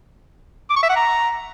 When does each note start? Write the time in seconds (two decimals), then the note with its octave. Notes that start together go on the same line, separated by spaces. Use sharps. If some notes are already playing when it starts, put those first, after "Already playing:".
0.70 D6
0.76 C#6
0.83 E5
0.89 F#5
0.96 A#5